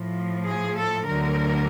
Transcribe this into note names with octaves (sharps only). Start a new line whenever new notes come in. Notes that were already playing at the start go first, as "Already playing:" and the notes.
Already playing: A2 F3
G#4
A4
D2 D3 F#3 A#4